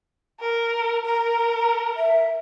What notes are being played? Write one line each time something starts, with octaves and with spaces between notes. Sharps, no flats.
A#4
A#4 A#5
E5